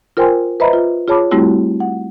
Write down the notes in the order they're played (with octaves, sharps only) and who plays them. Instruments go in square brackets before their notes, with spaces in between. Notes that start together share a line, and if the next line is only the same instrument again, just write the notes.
[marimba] F4 A#4 C5 G5 G#5 C6
B4 C5 D#5 E5 A#5 B5
F4
F4 G#4 C#5 A5 B5 D6
G3 A3 C4 E4 F#4 G4
F#5